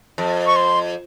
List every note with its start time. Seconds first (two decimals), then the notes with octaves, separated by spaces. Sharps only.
0.18 F2
0.46 C#6
0.56 C6